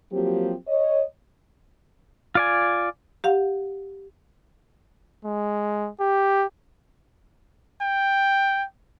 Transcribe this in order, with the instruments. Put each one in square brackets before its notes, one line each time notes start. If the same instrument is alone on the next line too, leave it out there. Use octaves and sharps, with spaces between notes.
[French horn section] F3 F#3 A#3 C4 G4
C#5 D#5
[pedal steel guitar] F4 D5 G#5
[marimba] G4 F5 F#5
[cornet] G#3
G4
G5